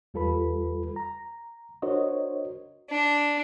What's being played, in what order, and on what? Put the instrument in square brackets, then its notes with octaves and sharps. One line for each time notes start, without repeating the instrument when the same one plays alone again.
[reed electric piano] E2 G3 F4 A4 B4 B5
A#5
D4 F#4 A#4 C5 C#5 D#5
[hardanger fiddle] D4